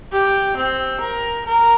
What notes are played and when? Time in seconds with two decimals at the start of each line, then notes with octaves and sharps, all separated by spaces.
0.12 G4
0.57 C4
1.01 A#4
1.46 A#4